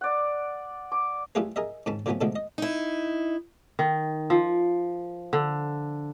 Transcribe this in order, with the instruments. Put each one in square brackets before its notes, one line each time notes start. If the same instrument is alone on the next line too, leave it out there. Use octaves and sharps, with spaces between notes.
[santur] D5 F#5
D6
[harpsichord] G3 A3 E4 F4 G#4 B4
G#4 A#4 D#5 E5
G#2 D#3 C#4 A5 B5
D3 F3 F#3 A3 B3 C#4
B2 D3 D#3 F3 G#3 A3
D#5
[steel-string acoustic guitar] D#4 E4
[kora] D#3
F3
D3